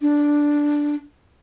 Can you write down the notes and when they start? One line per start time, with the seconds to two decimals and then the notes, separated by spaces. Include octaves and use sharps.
0.02 D4